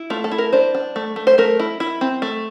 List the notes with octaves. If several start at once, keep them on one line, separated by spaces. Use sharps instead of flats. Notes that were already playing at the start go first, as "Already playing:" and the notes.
Already playing: E4
A3 F4
A4
E4
A#4
D4 C5
D4
A3
A3
C5
A3 A#4
E4
E4
C4
A3